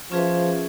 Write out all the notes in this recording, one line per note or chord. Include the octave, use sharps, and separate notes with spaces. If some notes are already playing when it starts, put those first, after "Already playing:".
F3 C#4 F4 G#4 B4 E5